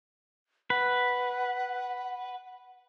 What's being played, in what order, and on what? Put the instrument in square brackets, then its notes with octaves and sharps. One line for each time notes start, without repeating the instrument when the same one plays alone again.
[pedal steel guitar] B4 [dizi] F#5